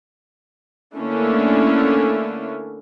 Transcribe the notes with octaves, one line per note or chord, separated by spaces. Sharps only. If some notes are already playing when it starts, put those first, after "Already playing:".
D3 A3 A#3 C#4 D4 E4